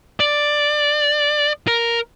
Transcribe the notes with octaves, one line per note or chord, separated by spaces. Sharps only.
D5
A#4